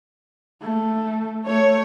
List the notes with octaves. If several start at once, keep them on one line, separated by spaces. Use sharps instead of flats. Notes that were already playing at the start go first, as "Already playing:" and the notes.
A3
A3 C#5